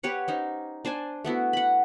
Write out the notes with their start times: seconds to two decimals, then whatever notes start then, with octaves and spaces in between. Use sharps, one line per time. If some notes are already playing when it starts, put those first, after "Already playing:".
0.03 G4 B4 C#5 F#5
0.28 C#4 D#4 C5
0.85 D4 C5 D5 G#5
1.25 A3 B3 E4 F#4
1.53 F#5 B5